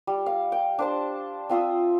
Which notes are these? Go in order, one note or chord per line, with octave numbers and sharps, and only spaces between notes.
G3
F5
G5
D4 C5 A5
C4 F4 E5 D#6